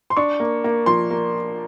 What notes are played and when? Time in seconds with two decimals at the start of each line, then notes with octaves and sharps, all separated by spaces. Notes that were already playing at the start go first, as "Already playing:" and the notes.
0.10 C6
0.17 D4 C#6
0.40 A#3
0.64 A#3
0.86 F3 C6
1.11 A#3